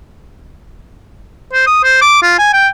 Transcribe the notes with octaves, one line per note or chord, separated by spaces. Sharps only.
C5
D#6
C5
D6
F4
G#5
G5